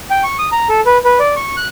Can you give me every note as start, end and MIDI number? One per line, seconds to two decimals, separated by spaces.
0.10 0.23 79
0.23 0.37 85
0.39 0.49 87
0.52 0.68 82
0.69 0.80 69
0.86 0.98 71
1.05 1.19 71
1.19 1.34 74
1.36 1.56 85
1.57 1.68 90